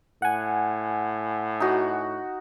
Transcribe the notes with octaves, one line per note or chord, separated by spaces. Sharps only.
A2 F#5 G#5
D#4 F#4